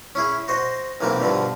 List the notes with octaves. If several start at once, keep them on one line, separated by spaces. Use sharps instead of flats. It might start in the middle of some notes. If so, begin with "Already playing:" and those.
C#4 E4 G#4
F#4 C5 D#5
B1 E3 A#3 C4 D6
G2 B2 D3 F3